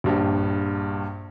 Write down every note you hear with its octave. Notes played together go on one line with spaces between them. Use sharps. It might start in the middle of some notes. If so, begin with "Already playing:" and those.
A#1 G2